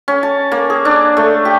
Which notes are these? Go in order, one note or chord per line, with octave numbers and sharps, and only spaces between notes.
C#4
A5
A#3
G#4
D4
A3
G4